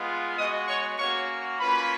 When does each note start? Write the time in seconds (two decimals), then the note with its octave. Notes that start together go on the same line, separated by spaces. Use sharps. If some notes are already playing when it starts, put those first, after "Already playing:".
Already playing: G#3 B3 F4
0.37 G#3 B3 F#4 D#5 D#6
0.68 C#5 C#6
0.99 A#3 C#4 F#4 C#5 C#6
1.59 A#3 C#4 F4 B4 B5